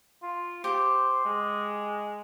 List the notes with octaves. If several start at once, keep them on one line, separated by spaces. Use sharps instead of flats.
F4
G4 C5
G#3